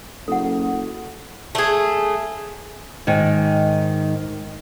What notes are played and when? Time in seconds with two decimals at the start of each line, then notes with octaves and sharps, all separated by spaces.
0.28 F#1 A4 F#5
1.55 A3 G#4
3.07 G#2 D#3